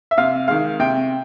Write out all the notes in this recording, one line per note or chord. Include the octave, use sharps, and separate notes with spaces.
E5
C3 F5
D#3 G#3 F5
C3 G5